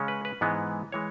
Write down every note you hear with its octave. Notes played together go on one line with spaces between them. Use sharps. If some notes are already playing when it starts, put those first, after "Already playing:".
Already playing: C#3 G#3 C#4
B4
B4
G#2 E3 G#3 B3
E3 G#3 C#5